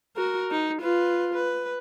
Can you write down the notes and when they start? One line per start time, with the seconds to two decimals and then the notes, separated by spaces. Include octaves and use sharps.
0.17 F#4 A#4
0.51 D#4
0.81 F4 B4
1.34 B4